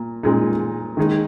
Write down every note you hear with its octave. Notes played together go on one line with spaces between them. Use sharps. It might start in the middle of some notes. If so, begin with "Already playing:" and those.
Already playing: A#2
A#2 G#3 D#4
D#3 G#3 D#4